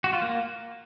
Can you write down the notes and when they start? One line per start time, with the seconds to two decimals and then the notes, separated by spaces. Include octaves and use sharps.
0.04 F#4
0.13 F4
0.22 A#3